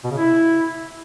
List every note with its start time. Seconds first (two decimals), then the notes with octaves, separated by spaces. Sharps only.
0.04 B2
0.11 C#3
0.18 E4